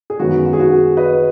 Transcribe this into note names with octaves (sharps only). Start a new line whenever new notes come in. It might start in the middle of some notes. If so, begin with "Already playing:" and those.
G#4
F#2 D#3 G#3 B3 F#4
F#4
G#4
F#4
B4 D#5